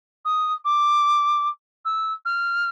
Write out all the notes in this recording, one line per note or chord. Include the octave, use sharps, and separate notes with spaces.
D#6
D6
E6
F6